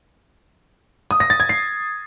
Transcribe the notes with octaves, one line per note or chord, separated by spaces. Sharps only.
D#6
A#6
A6
G#6
C7